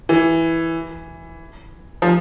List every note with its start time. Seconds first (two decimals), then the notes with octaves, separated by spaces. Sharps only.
0.09 E3
2.02 F3